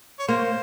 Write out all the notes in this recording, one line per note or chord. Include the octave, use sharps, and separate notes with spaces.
C#5
A#3 C5